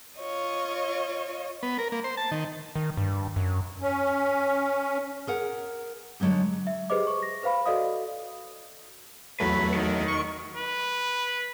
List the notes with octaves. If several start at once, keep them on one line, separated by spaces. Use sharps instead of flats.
F4 C#5 D#5
B3
A#4
A#3
C5
A5
D#3
D#3
G2
F#2
C#4
G#4 A#4 F#5
D3 F#3 G#3 C4 G4
E5
G4 G#4 B4 C5 D#5 D6
C#6
A#6
B4 C5 F5 B5
F#4 A4 D5 D#5 F5 D#6
E2 F#3 A3 B4
D#3
C#6
B4